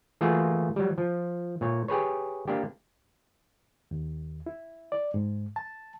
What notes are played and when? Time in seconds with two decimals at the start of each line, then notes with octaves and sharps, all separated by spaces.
0.21 E3 A3 A#3 F4 F#4 G#4
0.76 F#3 G3
0.98 F3
1.61 A#2 C#5
1.88 G4 G#4 B4 C#5
2.48 A#3 D4 G4
3.91 D#2
4.46 E4
4.92 D5
5.14 G#2
5.56 A5